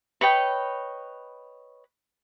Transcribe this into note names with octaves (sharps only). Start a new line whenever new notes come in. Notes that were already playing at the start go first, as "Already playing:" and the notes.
B4 C#5 D#5 G5